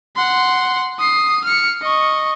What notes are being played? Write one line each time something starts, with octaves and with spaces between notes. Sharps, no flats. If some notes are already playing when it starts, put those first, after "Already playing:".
F#5 C6
D#6 C7
F6 C#7
D#5 C#6